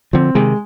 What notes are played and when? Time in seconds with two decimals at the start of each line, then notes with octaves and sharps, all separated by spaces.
0.13 D3 F3 C4
0.35 C3 D#3 G#3